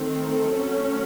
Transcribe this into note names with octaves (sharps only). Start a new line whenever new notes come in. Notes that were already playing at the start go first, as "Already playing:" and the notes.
Already playing: D#3 A3 C4
A4
F#3 A3 C#4